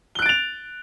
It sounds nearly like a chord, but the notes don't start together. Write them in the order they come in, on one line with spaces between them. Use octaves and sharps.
G7 F#6 D7 A6 F7